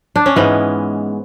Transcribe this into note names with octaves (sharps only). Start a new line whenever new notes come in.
D4
C#4
G#2 E3 G#3 B3